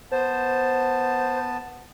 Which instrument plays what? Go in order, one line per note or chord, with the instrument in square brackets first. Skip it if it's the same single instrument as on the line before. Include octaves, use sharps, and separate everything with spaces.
[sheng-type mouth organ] B3 A5 [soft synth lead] C5